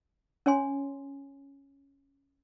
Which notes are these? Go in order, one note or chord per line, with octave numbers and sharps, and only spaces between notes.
C#4 C#5 G#5 C6